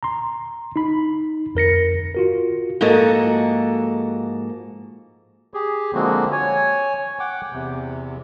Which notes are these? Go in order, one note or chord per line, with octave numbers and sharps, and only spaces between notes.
A#5 C6
D#4 B5
F2 A#4 A#6 C#7
F4 F#4 A#4
G#2 F3 A#3 F#4 A4 D#5
G4 G#4
D3 F3 G#3 A#3 C4 F#4
C#5 G#5
F#5 G5 D6
E2 C3